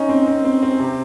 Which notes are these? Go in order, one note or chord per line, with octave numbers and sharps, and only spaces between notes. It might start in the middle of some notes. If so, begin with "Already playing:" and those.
Already playing: C#4 D#4
C4
C4
C4
C4
C3